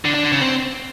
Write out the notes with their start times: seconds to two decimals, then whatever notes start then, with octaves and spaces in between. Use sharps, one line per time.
0.05 D3
0.14 D4
0.23 D3
0.32 C#3
0.41 C4